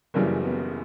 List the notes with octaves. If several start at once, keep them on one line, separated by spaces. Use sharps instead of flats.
F#1 F#2 C#3 E3 G3 A#3
B3